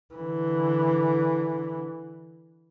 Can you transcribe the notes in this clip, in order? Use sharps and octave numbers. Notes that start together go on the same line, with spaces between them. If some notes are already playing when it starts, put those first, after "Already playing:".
D3 E3